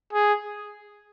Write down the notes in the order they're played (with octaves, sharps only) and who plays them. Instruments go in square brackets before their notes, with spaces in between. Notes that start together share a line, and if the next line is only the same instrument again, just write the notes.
[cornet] G#4